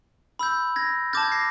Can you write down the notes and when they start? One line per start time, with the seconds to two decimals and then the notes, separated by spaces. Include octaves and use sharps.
0.39 B5 E6 G6
0.76 G#6 A#6
1.13 A5 D6 F6 G6 A6
1.23 G#6
1.32 A#6 C7